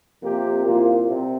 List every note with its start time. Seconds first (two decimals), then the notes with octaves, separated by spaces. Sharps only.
0.22 F2 C3 A#3 G4
0.65 C2 A#2 A#3 F4
1.08 C3